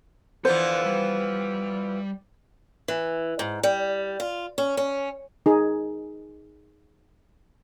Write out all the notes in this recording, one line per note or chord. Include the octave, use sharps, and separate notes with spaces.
E3 F3 B3 A4 C5 D5
G3
E3
G#2
G3
F4
C#4
C#4
D#4 G#4